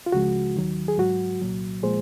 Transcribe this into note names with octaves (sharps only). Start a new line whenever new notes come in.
F4
C#2 C#3 F3 G#3 F#4
D#2 D#3 F#3
G#4
G#2 F#3 F#4
C2 A#2 F#3
A#2 F3 G#3 G#4 C5